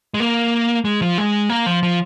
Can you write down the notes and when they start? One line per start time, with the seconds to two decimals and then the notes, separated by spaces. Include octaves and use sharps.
0.14 G#3
0.20 A#3
0.85 G#3
1.02 F3
1.18 G#3
1.49 A#3
1.66 F3
1.83 F3